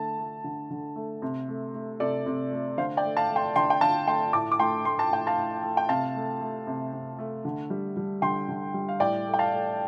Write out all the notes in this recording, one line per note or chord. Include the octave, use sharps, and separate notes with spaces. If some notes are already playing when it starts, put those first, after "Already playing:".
Already playing: D3 A3 A5
A3
D3
D3
A3
C3
A3
A3
C3 A4 D5
C3
A3
D3 C5 F5
D5 G5
A3
F5 A5
A3
G5 C6
D3 G5 C6
G5
D3 F5 A5
A3 G5 C6
A2 A5 D6
D6
A3 G5 C6
A3 C6
A5
A2 G5
F5 A5
A2
A3
G5
C3 F5 A5
A3
A3
C3
C3
A3
D3
G3
G3
D3 G5 C6
D3
G3
F5
A2 D5 G5
A3
G5
F5 A5
A3